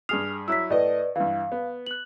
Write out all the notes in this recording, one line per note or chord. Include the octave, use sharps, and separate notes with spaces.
G2 G#4 D#6 F6 C7 F7
F#3 E4 E6 B6
A2 B4 D5 D#5
G2 E3 F5
B3
F#6 F#7